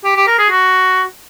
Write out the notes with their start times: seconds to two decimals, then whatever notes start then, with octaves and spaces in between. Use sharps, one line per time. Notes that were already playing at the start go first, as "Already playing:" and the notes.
0.04 G4
0.16 G4
0.27 A#4
0.39 G#4
0.50 F#4